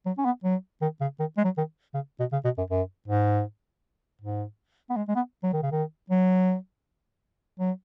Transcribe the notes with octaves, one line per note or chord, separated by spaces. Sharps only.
F#3
C#4
B3
F#3
D#3
C#3
D#3
G#3
F#3
D#3
C#3
B2
C#3
B2
F#2
F#2
G#2
G#2
B3
G#3
G#3
B3
F#3
D#3
C#3
D#3
F#3
F#3